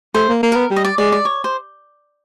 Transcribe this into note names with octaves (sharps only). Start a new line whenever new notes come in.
A3 C5
A#3
A#3
B3 A#4
G3
D#5
D5
G#3 D5
D5
C#5
C5